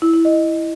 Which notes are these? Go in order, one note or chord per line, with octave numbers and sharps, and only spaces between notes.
E4
E4
D#5